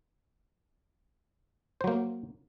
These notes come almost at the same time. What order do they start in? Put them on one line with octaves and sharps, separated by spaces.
C5 F#3 A#3